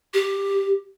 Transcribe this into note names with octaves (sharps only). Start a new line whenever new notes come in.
G4